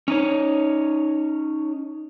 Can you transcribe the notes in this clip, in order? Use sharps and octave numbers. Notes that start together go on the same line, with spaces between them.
C#4 D#4 C#5